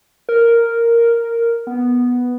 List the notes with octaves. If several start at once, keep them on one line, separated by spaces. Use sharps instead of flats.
A#4
B3